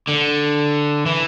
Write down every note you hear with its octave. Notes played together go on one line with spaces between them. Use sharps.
D3
E3